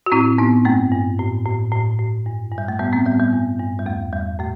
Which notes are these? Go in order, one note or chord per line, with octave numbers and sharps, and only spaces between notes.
F#4
A2 C4 E4
A2 B3 D#4
G2 A3 C4
G2
A2
A2
A2
A2
G2
G2
G3
A3
A2 G3 B3
A3 C4
A2 G3 B3
G3 B3
G2
G2
G3
E2 A3
E2 G3
A2 A3